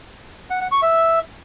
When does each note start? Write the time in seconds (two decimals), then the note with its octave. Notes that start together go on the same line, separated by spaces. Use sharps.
0.50 F#5
0.61 F#5
0.72 C#6
0.82 E5